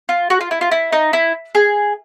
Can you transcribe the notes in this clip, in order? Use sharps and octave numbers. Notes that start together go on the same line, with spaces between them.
F4
F#4
F4
E4
F4
E4
D#4
E4
G#4